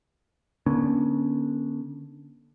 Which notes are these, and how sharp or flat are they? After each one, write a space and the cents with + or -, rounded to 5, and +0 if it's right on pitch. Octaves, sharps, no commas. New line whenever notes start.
D3 +0 A#3 +45 C#4 +0